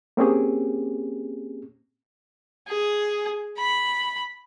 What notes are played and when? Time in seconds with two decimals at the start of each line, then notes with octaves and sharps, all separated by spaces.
0.17 A#3 C4 C#4 G4 G#4
2.68 G#4
3.58 B5